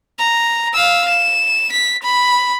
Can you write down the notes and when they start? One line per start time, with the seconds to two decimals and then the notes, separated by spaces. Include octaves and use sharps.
0.19 A#5
0.73 F5 E6
1.09 E7
1.72 B6
2.03 B5